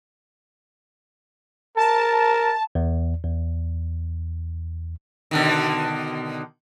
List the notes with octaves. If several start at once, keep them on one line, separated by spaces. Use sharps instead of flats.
A#4 A5
E2
E2
B2 D3 D#3